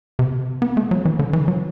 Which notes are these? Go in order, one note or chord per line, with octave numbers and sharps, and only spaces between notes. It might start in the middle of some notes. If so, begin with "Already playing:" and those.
C3
B3
A3
F#3
E3
D3
E3
F#3